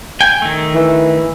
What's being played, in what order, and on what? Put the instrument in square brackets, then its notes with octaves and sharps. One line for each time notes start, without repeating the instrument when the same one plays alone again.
[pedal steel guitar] G5 G#5
D#3 A3
[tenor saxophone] E3